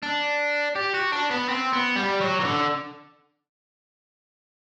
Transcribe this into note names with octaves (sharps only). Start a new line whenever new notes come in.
D4
G4
F#4
D4
B3
C4
B3
G3
F#3
E3
D3